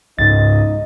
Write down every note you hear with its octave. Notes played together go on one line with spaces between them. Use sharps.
C#2 G#2 D#4 D#5 A6